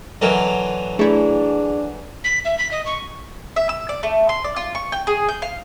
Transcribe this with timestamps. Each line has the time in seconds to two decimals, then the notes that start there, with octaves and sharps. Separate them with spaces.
0.21 D3 E3 F#3 A#4 D#5
0.99 A3 D4 E4 G#4
2.24 B6
2.45 E5
2.58 B6
2.72 D#5
2.86 C#6
3.56 E5
3.69 E6
3.89 D5
4.03 A3
4.29 C6
4.44 D5
4.56 F4
4.75 C#6
4.92 G5
5.07 G#4
5.29 G6
5.42 F5